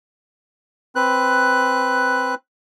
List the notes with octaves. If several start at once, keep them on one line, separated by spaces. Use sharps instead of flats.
C4 B4 F#6